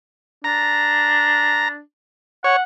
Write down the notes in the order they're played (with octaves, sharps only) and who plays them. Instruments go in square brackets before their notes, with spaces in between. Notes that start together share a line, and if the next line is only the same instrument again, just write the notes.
[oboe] D4 [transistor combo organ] A#5
[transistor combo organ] C#5 [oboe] F#5